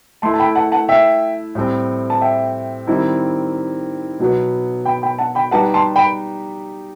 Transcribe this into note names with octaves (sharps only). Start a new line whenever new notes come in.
A3 E4 A4 A5 C6
A5
G5 B5
F#5 A5
F#5 A5
E5 G5
A2 G3 C4
A5
E5 G5
D#3 G3 C4 E4
B2 F#3 B3
G5 B5
G5 B5
F#5 A5
G5 B5
G3 D#4 G4 B4 F#5 A5
A5 C6
G5 B5